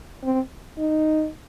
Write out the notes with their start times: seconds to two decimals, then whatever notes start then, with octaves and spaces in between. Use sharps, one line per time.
0.24 C4
0.78 D#4